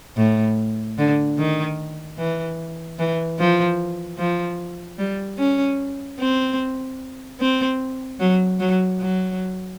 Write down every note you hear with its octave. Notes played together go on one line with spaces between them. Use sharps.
A2
D3
D#3
E3
E3
F3
F3
G3
C#4
C4
C4
F#3
F#3
F#3